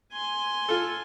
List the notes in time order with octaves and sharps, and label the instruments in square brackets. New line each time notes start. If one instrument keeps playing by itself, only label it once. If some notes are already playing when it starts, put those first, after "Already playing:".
[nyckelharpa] G#5 C6
[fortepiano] F4 A4